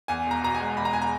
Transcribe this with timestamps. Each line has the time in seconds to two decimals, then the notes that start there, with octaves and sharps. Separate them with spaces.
0.08 E2 G#5
0.26 E1 A#5
0.43 B2 A#5
0.55 G#5
0.60 G#3
0.77 E2 B5
0.85 A#5
0.93 G#5
1.02 A#5